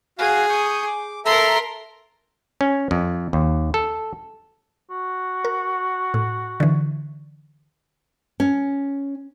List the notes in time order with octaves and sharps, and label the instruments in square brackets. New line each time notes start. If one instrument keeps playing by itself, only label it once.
[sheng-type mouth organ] F#4 F5 [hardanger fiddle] G#4
[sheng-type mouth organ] C#6 D#6 G6
D6
[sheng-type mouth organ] A4 E5 A#5 [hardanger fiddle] A#4 C6
[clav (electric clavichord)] C#4
F2
D#2
A4
[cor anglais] F#4
[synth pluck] A#4
A2
D3 E3
[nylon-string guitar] C#4